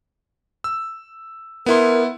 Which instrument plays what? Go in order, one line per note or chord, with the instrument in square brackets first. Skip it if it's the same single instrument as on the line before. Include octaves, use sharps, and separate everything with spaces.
[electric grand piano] E6
[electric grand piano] B3 E4 C6 [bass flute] A#4